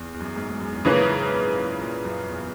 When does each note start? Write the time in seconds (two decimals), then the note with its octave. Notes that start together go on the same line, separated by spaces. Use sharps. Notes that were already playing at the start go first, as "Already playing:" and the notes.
Already playing: E2
0.14 E2
0.21 F#2
0.36 G#2
0.48 G#2
0.60 F#2
0.72 E2
0.85 F#2 C#3 E3 A#3 C#4
1.09 G#2
1.33 A#2
1.57 A#2
1.81 A#2
2.05 F#2
2.29 E2